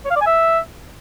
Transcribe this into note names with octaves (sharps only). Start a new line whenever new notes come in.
C#5
F5
D5
G#5
E5